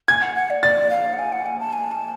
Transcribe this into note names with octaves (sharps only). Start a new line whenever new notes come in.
G#5 G#6
F#5
F#5
D5
D5 A6
F5
F#5
G#5
F#5
G#5
A5
G#5
A5